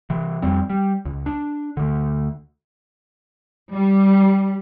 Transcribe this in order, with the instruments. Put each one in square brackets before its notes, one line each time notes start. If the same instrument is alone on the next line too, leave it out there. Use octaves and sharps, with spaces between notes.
[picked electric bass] C3 E3
F2 G3 C4
G3
C#2
D4
D2 D3
[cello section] G3